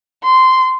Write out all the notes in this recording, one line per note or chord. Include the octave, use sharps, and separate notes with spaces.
C6